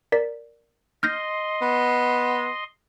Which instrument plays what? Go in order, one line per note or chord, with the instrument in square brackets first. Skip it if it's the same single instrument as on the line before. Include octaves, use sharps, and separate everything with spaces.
[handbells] A#4 D5 B6
[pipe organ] D#5 C6 [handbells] F6 G6 A#6
[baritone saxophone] B3